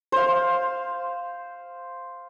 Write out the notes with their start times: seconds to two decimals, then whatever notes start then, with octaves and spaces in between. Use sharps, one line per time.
0.12 C5 F5